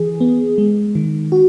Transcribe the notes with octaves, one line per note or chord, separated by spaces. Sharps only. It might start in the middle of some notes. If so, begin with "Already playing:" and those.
Already playing: E3 G#4
B3
G#3
D#3
F#4